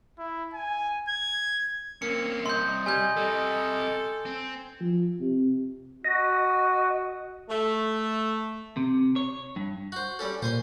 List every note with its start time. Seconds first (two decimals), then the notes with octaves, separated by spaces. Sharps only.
0.18 E4
0.54 G#5
1.08 G#6
2.02 A#3 C4 C#4 C#7
2.46 C2 D#5 C6 G6
2.86 G3 G#5 G6 G#6
3.16 C3 G3 A4
4.25 C4
4.80 F3
5.20 C3
6.05 F#4 D#5
7.49 A3
8.77 C3
9.16 C#5
9.56 G2
9.92 F#4 C5
10.19 G3 C#4 A4
10.42 A#2 C5 G#5 C6